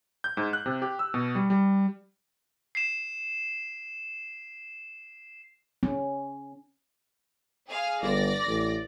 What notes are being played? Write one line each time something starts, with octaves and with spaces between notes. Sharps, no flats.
G6
G#2
F#6
C3
G4
E6
B2
G3
G3
C7 E7
C#4
G#4 F5 G#5
G1 D5 A#6
A1